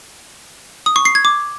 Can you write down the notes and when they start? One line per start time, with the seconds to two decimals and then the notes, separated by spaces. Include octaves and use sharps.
0.86 D#6
0.96 C#6
1.05 C7
1.15 G#6
1.25 D6